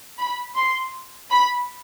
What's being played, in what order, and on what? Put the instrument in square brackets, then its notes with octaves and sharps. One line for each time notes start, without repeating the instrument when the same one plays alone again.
[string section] B5
C6
B5